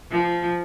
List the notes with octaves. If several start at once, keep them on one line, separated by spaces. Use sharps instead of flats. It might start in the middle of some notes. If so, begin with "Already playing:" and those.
F3